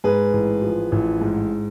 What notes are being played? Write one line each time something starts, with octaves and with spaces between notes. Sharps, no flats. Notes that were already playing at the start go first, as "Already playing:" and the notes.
G#2 G#4 B4
A1
F3
A1
G#2